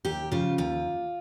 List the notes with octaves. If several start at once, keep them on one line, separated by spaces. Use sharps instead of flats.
D#2 G4
C#3 F3 F4
D#2 F4